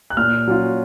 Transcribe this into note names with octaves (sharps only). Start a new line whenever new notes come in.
F#6
A#2 F6
F#3 C#4 F4